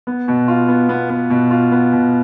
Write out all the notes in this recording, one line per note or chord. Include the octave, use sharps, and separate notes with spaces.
B3
B2
F4
B3
B3
B3
B2
F4
B3
B2